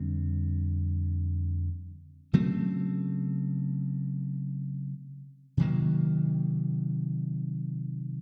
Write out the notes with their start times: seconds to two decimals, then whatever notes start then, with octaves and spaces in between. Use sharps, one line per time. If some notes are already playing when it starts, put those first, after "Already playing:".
Already playing: F2 D3 G3 C4
2.33 C#3 F#3 A3 C4
5.57 C3 D#3 F#3 A#3